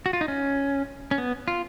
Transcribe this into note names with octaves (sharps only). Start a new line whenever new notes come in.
F#4
F4
D#4
C#4
C#4
B3
F4